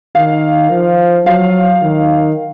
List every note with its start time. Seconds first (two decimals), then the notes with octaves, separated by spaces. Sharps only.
0.15 D#3 F5
0.70 F3
1.26 F#3 F5
1.82 D#3